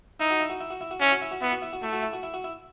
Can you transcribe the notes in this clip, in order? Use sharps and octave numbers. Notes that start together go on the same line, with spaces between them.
D#4 E4
F#4
E4
F#4
E4
F#4
E4
F#4
C#4 E4
F#4
E4
F#4
B3 E4
F#4
E4
F#4
A3 E4
F#4
E4
F#4
E4
F#4
E4